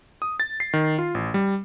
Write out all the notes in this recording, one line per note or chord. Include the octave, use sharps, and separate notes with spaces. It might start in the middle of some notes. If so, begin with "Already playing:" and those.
D#6
A6
C7
D#3
F4
A1
G3